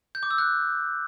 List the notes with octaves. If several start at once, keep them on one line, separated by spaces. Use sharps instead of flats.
G6
D6
E6
F#6